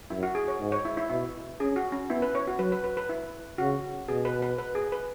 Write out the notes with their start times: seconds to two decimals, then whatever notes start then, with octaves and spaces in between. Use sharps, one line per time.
0.10 F#2 E4
0.23 F#4
0.35 G#4
0.48 C#5
0.60 G#2
0.72 C#5
0.85 E4
0.97 E4
1.09 B2 E4
1.60 C#4 G#4
1.76 F#4
1.92 C#4
2.10 B3 E4
2.22 B4
2.35 C#5
2.47 F#4
2.59 F#3 B4
2.72 B4
2.84 B4
2.97 B4
3.09 E4
3.58 C#3 F#4
4.09 B2 G#4
4.25 B4
4.42 B4
4.58 B4
4.75 G#4
4.92 B4